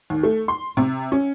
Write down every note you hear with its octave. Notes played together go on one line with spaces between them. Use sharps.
D#2
A3
C6
C3
C#4